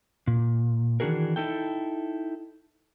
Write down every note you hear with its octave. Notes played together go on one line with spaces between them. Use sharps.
A#2
D#3 E3 D4 F#4 G#4 A#4
D#4 E4 A4 G5